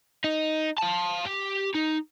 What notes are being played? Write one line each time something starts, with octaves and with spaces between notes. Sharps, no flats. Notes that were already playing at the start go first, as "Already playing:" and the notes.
D#4
F5 A5
G4
D#4